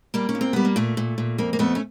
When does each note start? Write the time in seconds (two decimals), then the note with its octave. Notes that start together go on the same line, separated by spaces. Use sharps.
0.14 G3 A#3
0.29 C#4
0.35 A#2
0.41 C4
0.53 G3 B3
0.65 A#3
0.76 A#2 A3
0.97 A#2
1.18 A#2
1.38 F2 A#3
1.53 A#3
1.59 F2 A3 B3
1.75 C#4